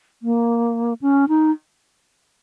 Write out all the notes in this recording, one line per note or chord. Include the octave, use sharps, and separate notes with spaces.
A#3
C#4
D#4